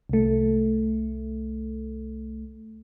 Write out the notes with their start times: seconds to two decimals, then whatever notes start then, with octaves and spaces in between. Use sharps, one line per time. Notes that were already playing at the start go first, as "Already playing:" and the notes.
0.09 C2 A3